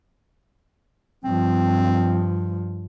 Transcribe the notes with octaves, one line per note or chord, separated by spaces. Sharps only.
G2 F3 C4